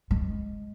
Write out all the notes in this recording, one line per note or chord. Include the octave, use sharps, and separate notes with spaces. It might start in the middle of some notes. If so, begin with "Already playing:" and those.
G#3